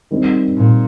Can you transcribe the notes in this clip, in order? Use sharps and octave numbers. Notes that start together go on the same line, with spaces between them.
D#3 G3 C4
A#2